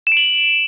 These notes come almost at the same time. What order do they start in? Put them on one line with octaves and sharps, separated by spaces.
E7 D7 F#7